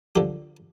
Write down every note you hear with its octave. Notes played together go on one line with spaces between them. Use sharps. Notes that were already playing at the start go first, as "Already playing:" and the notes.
D3 F3 G4